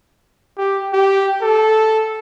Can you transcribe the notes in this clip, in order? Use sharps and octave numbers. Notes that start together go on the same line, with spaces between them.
G4
G4
A4